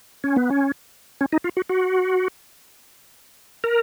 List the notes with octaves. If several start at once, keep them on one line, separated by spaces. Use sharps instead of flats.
C#4
B3
C#4
C#4
D#4
F4
F#4
F#4
A#4